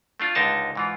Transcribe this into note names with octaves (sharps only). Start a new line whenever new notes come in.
A3 D4 F4
C#2 D3 D#4 A#4 A5
G#2 E3 F4